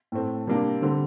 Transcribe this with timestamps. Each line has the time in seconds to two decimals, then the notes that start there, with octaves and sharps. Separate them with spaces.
0.12 A2 A3 C4
0.47 C3 G3 A#3 D4
0.82 D3 G3 C4